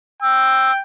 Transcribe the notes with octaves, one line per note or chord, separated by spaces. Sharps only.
G5 E6